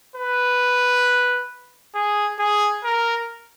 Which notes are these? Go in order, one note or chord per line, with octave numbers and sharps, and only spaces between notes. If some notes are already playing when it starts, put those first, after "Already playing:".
B4
G#4
G#4
A#4